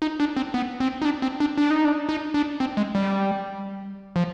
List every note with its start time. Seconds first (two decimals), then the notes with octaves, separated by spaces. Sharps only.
0.02 D#4
0.20 D4
0.37 C4
0.54 B3
0.80 C4
1.02 D#4
1.05 D4
1.22 C4
1.40 D4
1.57 D4
1.70 D#4
1.85 D4
2.09 D#4
2.34 D4
2.60 C4
2.77 G#3
2.95 G3
4.16 F3